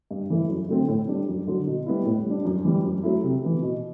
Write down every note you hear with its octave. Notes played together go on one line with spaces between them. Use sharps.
G2
E3 A3 E4
F#2
D3 F#3 A3 C4
A2
G3 D4
F#2
D3 F#3
B2
G3 B3 E4
A2
G3 D4
F#2
E3 G3
F#2
F#3 A3 E4
C3
E3 B3
B2